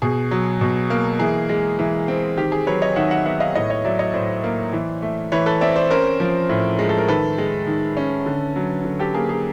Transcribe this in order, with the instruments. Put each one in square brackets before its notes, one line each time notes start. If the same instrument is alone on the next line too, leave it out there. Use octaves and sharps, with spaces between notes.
[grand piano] B2 G#4
F#3
B2
A#3
E3 G#4
G#3
E3
C4
D#3 G4
G#4
F#3 B4 C#5
C#5 D#5
D#3 E5 F#5
E5 F#5
B3 E5 F#5
D#5 F5
A2 C#5 D#5
C#5 D#5
F#3 D5 E5
C#5 D#5
A2 C5 D5
A#3
E3
A3
E3 B4 C#5
A4 B4
C4 D5 E5
C5 D5
C#4 A#4 C5
F3
A2
G#3
A4
A#4
D#3 A4 B4
G#3
D#3
C#4
D3
F#3
D3
G4 A4
A#3 G#4
G#4